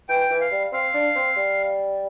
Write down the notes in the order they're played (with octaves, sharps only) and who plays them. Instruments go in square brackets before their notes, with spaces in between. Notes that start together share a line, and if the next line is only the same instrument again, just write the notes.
[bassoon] E3 [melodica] G5
[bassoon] E3
[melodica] F5
[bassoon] G3
[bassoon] C4 [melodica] F5
[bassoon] D4
C4
G3